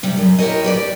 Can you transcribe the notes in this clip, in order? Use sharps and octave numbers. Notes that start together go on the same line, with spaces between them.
C3 G3
F#2
E4 G4 A4 A#4 C#5 D#5
G4 B4 D5